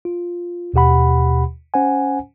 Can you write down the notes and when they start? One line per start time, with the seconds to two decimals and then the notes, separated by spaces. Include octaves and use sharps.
0.05 F4
0.74 D#2 B2 G4 F#5 B5
1.74 C#4 C5 F#5 G#5